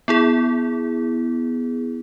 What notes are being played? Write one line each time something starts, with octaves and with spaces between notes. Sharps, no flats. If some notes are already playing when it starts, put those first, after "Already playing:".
B3 E4 G#4